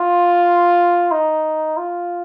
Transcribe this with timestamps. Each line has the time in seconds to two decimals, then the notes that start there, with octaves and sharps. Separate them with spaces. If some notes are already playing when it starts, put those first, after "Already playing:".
Already playing: F4
1.11 D#4
1.77 F4